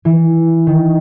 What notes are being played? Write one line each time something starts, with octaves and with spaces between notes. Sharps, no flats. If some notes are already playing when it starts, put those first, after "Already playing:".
E3
D#3